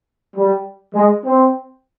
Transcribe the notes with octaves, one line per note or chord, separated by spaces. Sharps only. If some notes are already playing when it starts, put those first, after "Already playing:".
G3
G#3
C4